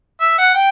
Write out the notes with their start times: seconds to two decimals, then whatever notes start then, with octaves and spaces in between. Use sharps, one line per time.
0.21 E5
0.38 F#5
0.55 G5